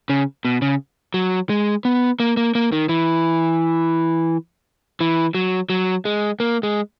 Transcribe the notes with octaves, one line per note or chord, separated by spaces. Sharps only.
C#3
B2
C#3
F#3
G#3
B3
A#3
A#3
A#3
D#3
E3
E3
F#3
F#3
G#3
A#3
G#3